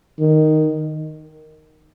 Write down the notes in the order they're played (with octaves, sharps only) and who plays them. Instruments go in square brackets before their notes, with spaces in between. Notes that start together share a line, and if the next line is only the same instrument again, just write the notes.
[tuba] D#3